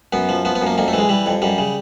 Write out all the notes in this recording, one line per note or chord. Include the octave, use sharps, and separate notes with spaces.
F#2 B3
F3
F3 B3
B3
F#2
A#3
F2 A#3
A3
E3
G#3
E3 G3
F2
F#2 G3
C#3